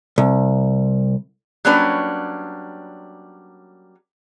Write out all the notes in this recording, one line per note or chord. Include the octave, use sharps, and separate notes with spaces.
C2
F#3 G3 A#3 C#4 D4 B4